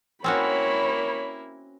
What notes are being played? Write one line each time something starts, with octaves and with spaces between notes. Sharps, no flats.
A#3 C4 C#4 E4 F#4 C#5 B5